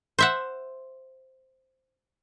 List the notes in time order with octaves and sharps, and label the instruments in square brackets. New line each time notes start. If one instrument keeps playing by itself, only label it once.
[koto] C5 E5 F#5